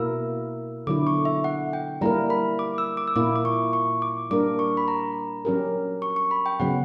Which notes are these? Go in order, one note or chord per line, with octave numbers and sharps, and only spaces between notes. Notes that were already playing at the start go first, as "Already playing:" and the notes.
Already playing: B2 A#3 E4 A#4 E6
D3 F#3 B3 E4 D6
C#6
E5
F#5
G5
G3 A#3 E4 A#4 A#5
B5
D6
E6
D6
E6
A#2 A#3 E4 D6
D6
C#6
C#6
D6
G3 A#3 D4 A#4 D6
C#6
B5
A#5
F#3 C#4 G4 A#4
C#6
C#6
B5
G5
C#3 F#3 B3 F#5